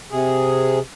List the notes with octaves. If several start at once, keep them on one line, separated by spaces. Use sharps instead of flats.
C3 G#4